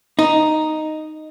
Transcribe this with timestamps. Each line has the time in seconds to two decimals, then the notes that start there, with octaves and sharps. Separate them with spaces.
0.19 D#4